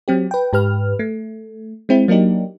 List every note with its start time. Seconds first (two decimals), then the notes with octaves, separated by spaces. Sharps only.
0.08 F#3 C4 G4
0.31 B4 G5
0.53 G#2 G4 B4 F6
0.99 A3
1.89 G#3 C4 E4
2.08 F#3 A#3 D4 D#4 G4